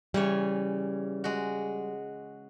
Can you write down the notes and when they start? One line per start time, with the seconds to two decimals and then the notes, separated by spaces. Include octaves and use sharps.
0.14 C#3 E3 G3 C#5
1.24 G#3 F#4